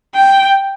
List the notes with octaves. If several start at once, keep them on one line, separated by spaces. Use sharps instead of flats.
G5